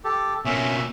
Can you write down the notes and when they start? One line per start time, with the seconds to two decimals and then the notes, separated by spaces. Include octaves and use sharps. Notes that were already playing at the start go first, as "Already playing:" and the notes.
0.04 G4 A4
0.45 B2 A#3 C#4 E5